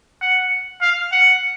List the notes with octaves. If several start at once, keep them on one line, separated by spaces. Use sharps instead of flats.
F#5
F5
F#5